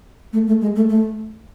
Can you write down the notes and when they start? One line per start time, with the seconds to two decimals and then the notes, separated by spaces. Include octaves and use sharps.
0.33 A3
0.47 A3
0.61 G#3
0.76 A3
0.89 A3